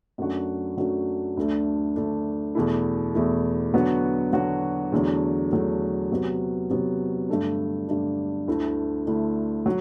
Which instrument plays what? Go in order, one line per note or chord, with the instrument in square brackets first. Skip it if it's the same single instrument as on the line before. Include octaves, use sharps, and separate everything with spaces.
[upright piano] F#2 F#3 A3 D4 F#4
F#2 F#3 A3 D4 F#4
D2 D3 A3 D4
D2 D3 A3 D4
E2 B2 A3 E4
E2 B2 A3 E4
D3 F#3 B3 F#4
D3 F#3 B3 F#4
E2 D3 F#3 A3
E2 D3 F#3 A3
C3 F#3 B3
C3 F#3 B3
G2 D3 A3 D4
G2 D3 A3 D4
D2 D3 A3 E4
D2 D3 A3 E4
F#3